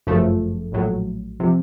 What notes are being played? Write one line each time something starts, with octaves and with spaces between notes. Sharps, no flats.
G1 F#2 C#3 F3 A3
A#1 A2 F#3
C3 F3